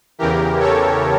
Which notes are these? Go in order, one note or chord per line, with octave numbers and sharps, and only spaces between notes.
E2 C#3 E3 G4 A#4
A4 C#5